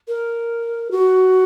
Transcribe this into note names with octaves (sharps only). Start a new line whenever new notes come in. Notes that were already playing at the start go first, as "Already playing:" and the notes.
A#4
F#4